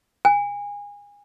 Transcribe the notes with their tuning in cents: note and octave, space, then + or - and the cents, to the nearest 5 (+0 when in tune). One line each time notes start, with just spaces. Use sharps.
G#5 -30